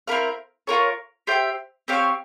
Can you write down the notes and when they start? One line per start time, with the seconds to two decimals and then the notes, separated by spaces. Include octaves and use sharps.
0.08 C4 E4 A#4 F5
0.67 F4 A#4 C#5
1.27 G4 C5 E5 G5
1.88 C4 G4 C#5 F5